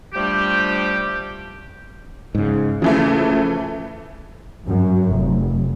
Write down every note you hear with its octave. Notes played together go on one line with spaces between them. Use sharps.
F3 G3 A3 D4 G4
G#2 C#3
C#3 E3 F3 A3
F#2
F1